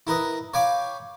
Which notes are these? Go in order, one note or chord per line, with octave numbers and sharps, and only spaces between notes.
E4 A#4 B4 D#5
C#5 F5 G5 G#5 B5 D6